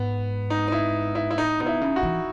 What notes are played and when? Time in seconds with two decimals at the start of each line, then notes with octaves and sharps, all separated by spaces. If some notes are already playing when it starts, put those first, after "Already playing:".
Already playing: G#2 B3
0.50 D#4
0.68 D#4
0.72 E4
1.15 E4
1.31 E4
1.38 A2 D#4
1.60 B2 D#4
1.66 E4
1.81 C#3
1.96 F#4
2.03 E3